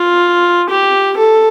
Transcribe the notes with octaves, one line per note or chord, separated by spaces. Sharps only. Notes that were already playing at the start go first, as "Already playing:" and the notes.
Already playing: F4
G4
A4